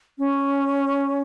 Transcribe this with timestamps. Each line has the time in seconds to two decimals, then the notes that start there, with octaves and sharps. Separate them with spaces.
0.18 C#4